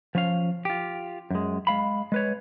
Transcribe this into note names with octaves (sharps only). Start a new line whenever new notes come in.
F3 C#4 F5
F4 G4
F#2 G#3
G#3 F5 B5
G#3 B4 C#5